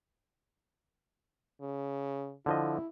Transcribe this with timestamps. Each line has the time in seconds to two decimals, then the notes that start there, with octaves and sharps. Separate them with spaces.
1.61 C#3
2.46 D3 F3 E4 D#5